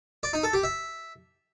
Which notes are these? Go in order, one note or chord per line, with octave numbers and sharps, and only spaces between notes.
D5
D#4
A4
G4
E5